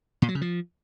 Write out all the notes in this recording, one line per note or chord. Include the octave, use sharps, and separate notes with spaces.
A#2
F#3
C#3
F3